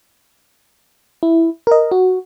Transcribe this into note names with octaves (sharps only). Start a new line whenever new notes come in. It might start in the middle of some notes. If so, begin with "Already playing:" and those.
E4
A#4 D#5
F#4